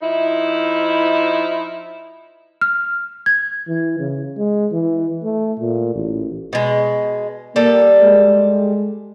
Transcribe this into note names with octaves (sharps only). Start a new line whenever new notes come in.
F3 D#4 E4
F6
G#6
E3
C#3
G#3
E3
A3
A#2
A1
B2 G#3
G3 A#3 A4
G#3